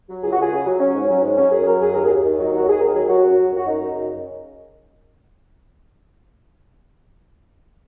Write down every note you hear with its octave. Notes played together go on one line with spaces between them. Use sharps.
F#3
C#2 G#4
F#4
C#2 G#4
C#3
F#3
F#3 C#4
G#2
F#3
G#2
F#3 C#4
F#2 G#4
F#3 A#4
F#2 G#4
D#2 A#4
G#4
D#2
D#3
F#3
D#4
D#2
F#4
D#2 G#4
D#3 A#4
F#3 G#4
F#3 F#4
F#2
F#3
F#2 F#4
F#2 D#4
F#2
C#3